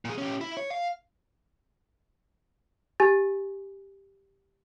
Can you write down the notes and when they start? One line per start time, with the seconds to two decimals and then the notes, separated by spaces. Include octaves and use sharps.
0.05 A#2 G#4
0.18 C#4 G4
0.41 E4
0.57 C#5
0.71 F5
3.00 G4 G#5 A6